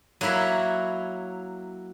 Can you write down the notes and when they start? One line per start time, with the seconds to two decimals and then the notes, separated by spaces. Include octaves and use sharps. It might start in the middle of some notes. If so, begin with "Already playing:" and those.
0.21 F#3 A#3 E4 C#5 B5